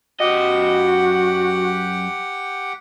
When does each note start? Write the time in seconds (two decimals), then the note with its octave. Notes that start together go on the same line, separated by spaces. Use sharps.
0.20 F#2 F#4 G4 D#5 F#5 G5